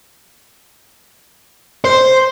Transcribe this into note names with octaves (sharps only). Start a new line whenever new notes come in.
C5